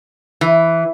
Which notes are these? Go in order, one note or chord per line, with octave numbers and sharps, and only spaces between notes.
E3